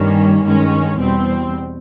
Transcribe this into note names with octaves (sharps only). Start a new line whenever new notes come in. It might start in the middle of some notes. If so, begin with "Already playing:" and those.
Already playing: G2 D#3 G3 A#3 C#4
G2 D#3 G#3 C#4
E2 B2 G3 C4